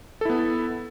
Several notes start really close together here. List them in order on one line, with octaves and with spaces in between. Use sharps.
A4 E4 B3